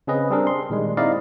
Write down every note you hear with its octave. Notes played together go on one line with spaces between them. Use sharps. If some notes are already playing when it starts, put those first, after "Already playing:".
C#3 C4 C#4 G#4 B4 D#5
G3 C4 D4 G#4 A#4
C6
A#2 D#3 G3 G#3
C4 D#4 E4 D5 D#5 F5